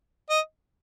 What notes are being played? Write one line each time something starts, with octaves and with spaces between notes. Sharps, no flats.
D#5